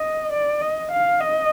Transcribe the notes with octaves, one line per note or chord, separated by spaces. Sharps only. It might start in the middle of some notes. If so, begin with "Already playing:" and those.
Already playing: D#5
D5
D#5
F5
D#5